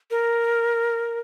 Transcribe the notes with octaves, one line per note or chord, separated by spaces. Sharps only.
A#4